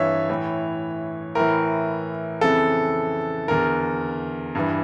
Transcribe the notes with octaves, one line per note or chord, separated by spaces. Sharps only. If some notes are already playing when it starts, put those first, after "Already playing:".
Already playing: G2 E3 C#5 E5 F5
A2 E3
A2 E3 A#4
F2 C#3 E3 A4
E2 D3 A#4
G2 E3